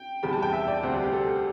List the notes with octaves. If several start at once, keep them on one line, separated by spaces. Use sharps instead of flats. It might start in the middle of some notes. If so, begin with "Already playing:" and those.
Already playing: G5
E2 C3 G3 B5
A5
G5
E5
D5
D2 C3 G3 C4 F#5
D5
G4
A4